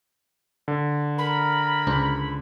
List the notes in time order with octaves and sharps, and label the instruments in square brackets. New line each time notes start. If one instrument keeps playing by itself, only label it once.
[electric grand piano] D3
[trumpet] A#4 [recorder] B5
[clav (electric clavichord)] C#2 D4 C5